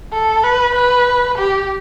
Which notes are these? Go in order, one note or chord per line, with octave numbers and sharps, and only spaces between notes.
A4
B4
B4
G4